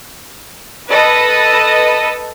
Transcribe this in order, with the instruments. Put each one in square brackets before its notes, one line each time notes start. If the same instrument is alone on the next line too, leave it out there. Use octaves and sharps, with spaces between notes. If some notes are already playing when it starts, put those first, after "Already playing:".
[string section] A4 B4 D#5